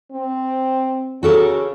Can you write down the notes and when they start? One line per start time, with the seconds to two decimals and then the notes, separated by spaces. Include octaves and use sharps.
0.12 C4
1.23 C#3 F#4 A4 A#4